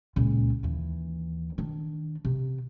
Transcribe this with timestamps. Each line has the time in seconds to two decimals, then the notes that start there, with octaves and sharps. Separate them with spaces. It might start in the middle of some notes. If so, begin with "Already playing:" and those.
0.16 C#2 A#2
0.63 D#2 E3
1.58 D#3 D4
2.25 C3